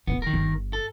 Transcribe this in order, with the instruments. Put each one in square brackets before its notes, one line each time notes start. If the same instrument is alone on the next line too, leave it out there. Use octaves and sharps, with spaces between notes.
[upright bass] D1 A1 [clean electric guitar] B3
[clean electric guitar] D#3 A#4
[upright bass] G1
[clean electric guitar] A4